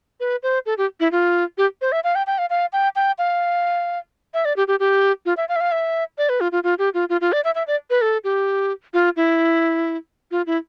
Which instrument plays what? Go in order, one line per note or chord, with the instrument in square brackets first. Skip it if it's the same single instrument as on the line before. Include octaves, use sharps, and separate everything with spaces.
[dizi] B4
C5
A4
G4
E4
F4
G4
C5
E5
F5
G5
G5
F5
F5
G5
G5
F5
E5
D5
G4
G4
G4
F4
E5
F5
E5
F5
E5
D5
B4
F4
F4
F4
G4
F4
F4
F4
D5
E5
E5
D5
B4
A4
G4
F4
E4
F4
E4